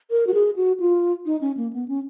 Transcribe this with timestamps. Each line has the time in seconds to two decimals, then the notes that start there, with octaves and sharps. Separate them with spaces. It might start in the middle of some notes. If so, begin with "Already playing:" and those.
0.11 A#4
0.27 F#4
0.34 G#4
0.56 F#4
0.80 F4
1.26 D#4
1.41 C#4
1.57 A#3
1.73 B3
1.88 C#4